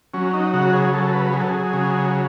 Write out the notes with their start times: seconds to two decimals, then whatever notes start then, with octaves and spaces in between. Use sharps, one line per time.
0.14 F#3 C#4
0.33 D#4
0.54 C#3 F#4
0.73 G#4
0.93 F#3 A4
1.13 B4
1.33 F#3 G#4
1.41 A4
1.49 G#4
1.73 C#3